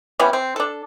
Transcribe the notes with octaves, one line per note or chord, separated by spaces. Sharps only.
E3 G3 B3 C#4
C4
D4 A4